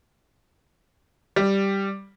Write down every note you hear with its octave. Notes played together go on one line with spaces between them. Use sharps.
G3